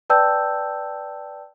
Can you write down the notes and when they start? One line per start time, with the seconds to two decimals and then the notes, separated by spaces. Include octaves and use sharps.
0.10 B4 D5 G5 A5 E6 G6